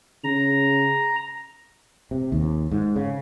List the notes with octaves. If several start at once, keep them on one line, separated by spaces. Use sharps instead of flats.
C#3 A#5
C3
D#2
G#2
C#3